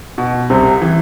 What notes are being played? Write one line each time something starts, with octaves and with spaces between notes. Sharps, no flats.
B2
C2 C3
E3